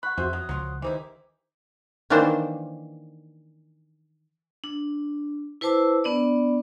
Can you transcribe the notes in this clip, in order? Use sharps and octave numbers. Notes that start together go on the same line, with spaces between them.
F#5 B5 C#6 F#6
F2 F#4 G#4 C5 E5
F#3 D#6
C#2 F3 F#3 F4
D#3 E3 D#4 E4 G4 C5 D6
D#3 E3 A#3 D4 C5
D4
E4 B4 C5 A5 D6 E6
B3 D4 D5